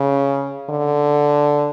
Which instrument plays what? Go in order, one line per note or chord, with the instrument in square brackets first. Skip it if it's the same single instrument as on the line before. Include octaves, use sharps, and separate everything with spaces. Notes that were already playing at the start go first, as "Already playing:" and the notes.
Already playing: [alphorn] C#3
D3